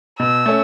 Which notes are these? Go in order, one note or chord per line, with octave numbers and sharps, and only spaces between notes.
B2 E6
A3 C#4